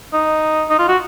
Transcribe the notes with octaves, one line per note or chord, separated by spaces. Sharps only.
D#4
D#4
F4
F#4